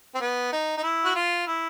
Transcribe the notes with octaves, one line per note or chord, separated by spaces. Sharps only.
C4
B3
D#4
D#4
E4
F#4
F4
E4